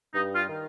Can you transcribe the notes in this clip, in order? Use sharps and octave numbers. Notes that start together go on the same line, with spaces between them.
G2 D#4
F4
D#3